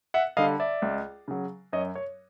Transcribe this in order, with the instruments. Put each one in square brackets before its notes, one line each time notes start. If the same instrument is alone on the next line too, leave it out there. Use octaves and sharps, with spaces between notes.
[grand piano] E5 F#5
D3 G3 D#5 F5
D5 E5
C#2
C#3 F#3
F#2 C#5 D#5
C#5